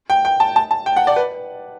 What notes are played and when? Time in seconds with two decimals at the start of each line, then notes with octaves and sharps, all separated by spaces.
0.10 G5
0.25 G5
0.40 A5
0.56 A5
0.71 A5
0.86 G5
0.96 F#5
1.07 D5
1.16 B4